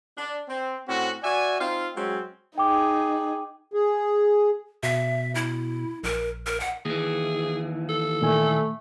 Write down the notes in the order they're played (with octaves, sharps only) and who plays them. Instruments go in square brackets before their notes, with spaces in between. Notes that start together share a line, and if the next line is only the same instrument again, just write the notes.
[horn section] D4
C4
A2 C4 C#4 F#4
F#4 D5 E5 G#5
C4 D#4 F4 F5
F#3 G#3 C4 C#4
[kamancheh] D#4 G#4 [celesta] G5 D6
[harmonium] G#4
[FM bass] B2 [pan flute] E5
[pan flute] E4
[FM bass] A#1 [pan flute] A#4
[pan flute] A#4
F#5
[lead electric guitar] D#2 E3 [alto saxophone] G#4
[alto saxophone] A4
[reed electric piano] A#2 D#3 G#5 [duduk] A3